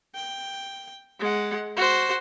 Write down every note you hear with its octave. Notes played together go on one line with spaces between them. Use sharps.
G5
G#3 F#5
F#4 C5